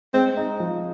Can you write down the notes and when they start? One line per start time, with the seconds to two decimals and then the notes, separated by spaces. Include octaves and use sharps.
0.14 G#3 C4
0.37 D#4
0.60 F3